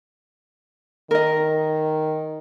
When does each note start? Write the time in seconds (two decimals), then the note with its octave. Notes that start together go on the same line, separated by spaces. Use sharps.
1.11 D#3 A#4 D#5